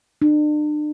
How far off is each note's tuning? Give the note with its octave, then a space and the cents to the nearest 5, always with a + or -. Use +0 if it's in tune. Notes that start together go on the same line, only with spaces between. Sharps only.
D4 +40